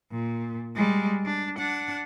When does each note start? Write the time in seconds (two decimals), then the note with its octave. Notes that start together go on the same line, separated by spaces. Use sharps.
0.12 A#2
0.75 G3 G#3
1.25 D4
1.59 D4 F#5